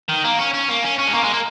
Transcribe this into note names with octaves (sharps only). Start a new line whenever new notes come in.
D#3
A#3
C#4
C#4
A#3
C#4
C#4
G#3
A#3
G#3
A#3